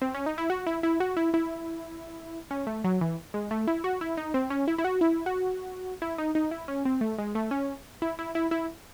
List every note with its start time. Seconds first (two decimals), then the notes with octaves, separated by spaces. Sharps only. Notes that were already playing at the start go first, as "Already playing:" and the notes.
0.02 C4
0.15 C#4
0.26 D#4
0.38 E4
0.50 F#4
0.66 E4
0.83 E4
1.00 F#4
1.17 E4
1.34 E4
2.51 C#4
2.67 A3
2.84 F#3
3.01 E3
3.34 G#3
3.51 A3
3.67 E4
3.84 F#4
4.01 E4
4.17 D#4
4.34 C4
4.50 C#4
4.68 E4
4.78 E4
4.85 F#4
5.01 E4
5.26 F#4
6.02 E4
6.18 D#4
6.35 D#4
6.51 E4
6.68 C#4
6.85 C4
7.01 A3
7.18 G#3
7.35 A3
7.51 C#4
8.02 E4
8.19 E4
8.35 E4
8.51 E4